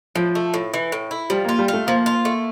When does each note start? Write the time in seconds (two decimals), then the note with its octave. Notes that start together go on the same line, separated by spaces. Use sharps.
0.15 A2 F3
0.35 A3
0.54 A2
0.74 E3
0.92 A2
1.11 E4
1.30 F3 G3
1.45 A#3 F4
1.59 G3
1.68 A3 F4
1.87 F3 A#3
2.06 F4
2.25 A3